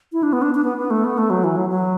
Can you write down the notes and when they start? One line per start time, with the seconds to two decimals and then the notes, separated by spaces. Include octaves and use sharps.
0.13 E4
0.23 D4
0.33 B3
0.42 D4
0.55 D4
0.64 B3
0.78 B3
0.90 A3
1.04 B3
1.18 A3
1.30 F#3
1.44 E3
1.56 F#3
1.69 F#3